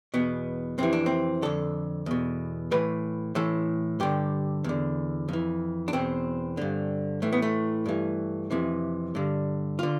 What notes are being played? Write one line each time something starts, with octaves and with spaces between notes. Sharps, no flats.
E2 B2 B3
F2 C3 E3 C4
D4
C4
F2 D3 A4
E2 B2
A2 E3 B4
A2 E3 A4
G2 D3 G4
E2 D3
F2 E3
D4
E2 B2 C4
G2 D3
A2 E3 A3
B3
A3
G2 E3
F2 C3 E3
G2 D3
D3 F4